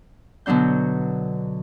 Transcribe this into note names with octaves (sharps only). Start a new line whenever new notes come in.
B2 D3 F#3 D4 G6